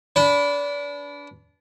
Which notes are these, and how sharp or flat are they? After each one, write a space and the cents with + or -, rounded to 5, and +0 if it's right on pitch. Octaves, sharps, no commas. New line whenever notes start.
D4 -30 B4 +0